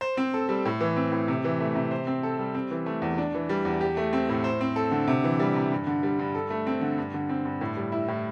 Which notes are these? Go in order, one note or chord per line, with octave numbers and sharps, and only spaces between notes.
C5
C4
A4
G3
A2
E3
C4
A2
C3
E3
A3
C3
C5
C4
A4
G3
C4
E3
A3
E2
D4
E3
G3
E2
G4
A3
C4
A2
C5
C4
A4
D3
C3
E3
G3
C3
G2
D3
G3
G2
A4
A3
C4
D3
G2
D3
C4
G2
A2
G3
E4
A2